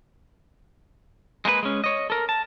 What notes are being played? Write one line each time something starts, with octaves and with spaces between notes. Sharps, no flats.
G#3 A#3 D#4 B4
G#3 C#4
C#5 D#5
A4 A#4
A5